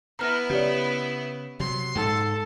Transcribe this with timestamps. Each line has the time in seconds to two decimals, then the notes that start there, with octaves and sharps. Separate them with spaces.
0.19 B3 E4 A#5 F6 A#6
0.50 C#3 G4 C#5 D5
1.60 C3 F#3 C6
1.95 G#2 A4